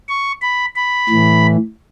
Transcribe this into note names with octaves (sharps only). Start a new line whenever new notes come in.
C#6
B5
B5
A2 E3